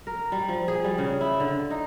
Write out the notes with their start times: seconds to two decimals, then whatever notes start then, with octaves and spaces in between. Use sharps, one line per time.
0.07 A#4
0.32 G3
0.49 F3
0.68 G#4
0.84 G3
0.98 C#3
1.21 E4
1.40 D3
1.71 D#4